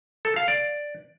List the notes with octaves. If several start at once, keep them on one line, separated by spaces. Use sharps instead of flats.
A4
F5
D5